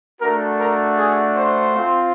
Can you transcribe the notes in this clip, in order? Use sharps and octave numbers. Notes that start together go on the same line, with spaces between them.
A3 D4 F#4 A#4
A#4
G#4
C5
C4 F4